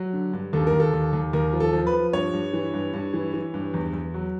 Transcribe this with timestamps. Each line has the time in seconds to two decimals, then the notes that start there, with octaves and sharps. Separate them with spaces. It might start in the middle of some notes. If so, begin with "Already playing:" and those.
Already playing: F#3
0.13 D3
0.33 G2
0.53 D#2 A4
0.67 A#4
0.73 D#2
0.80 A4
0.94 D#2
1.13 D#2
1.33 D#2 A#4
1.53 F3
1.60 A4
1.73 F3
1.87 B4
1.93 F3
2.13 G2 C#5
2.33 G2
2.53 E3
2.74 G2
2.94 G2
3.14 E3
3.34 E3
3.54 G2
3.74 E2
3.93 E2
4.14 F#3